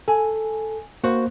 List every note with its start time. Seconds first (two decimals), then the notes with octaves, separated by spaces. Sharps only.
0.08 A4 G#5
1.04 A#3 F#4 C5